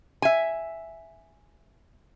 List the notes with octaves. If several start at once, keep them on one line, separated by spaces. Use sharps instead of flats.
E5 G#5